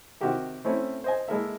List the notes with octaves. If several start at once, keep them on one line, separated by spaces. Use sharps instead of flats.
C3 D#3 F#4 G4 A#4
A3 C4 C#4 E4
C5 D#5 G#5
G#3 A#3 E4 A4 A#4 E5